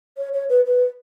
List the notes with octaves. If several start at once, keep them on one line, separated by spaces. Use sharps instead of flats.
C#5
C#5
B4
B4